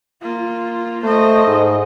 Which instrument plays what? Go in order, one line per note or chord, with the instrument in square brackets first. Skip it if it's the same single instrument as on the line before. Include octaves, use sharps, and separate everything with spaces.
[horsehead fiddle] A#3 F4
[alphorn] A3 [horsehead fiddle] C5 D#5
[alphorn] G#2